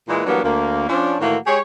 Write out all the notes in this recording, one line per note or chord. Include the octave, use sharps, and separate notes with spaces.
A#2 E3 G#3
E3 F#3 G3 A#3 B3 D4
D2 A#3
F3 C#4 D4
A2 D#3 E3 A3 A#3 F#4
G#3 G4 G#4 C#5